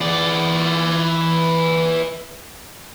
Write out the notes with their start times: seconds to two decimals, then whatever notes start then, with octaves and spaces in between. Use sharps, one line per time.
0.01 E3 D5